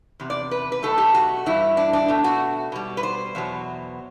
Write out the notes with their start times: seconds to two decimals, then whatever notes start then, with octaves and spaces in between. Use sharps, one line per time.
0.20 E2 C3
0.30 D5
0.51 B4
0.72 B4
0.83 B2 F#3 A3 A4
0.98 G4
1.14 F#4
1.46 G2 E3 G3 E4
1.77 D4
1.93 D4
2.08 B2 A3
2.24 F#4
2.72 B2 G3
2.97 B4
3.03 C5
3.35 E2 B2 F#3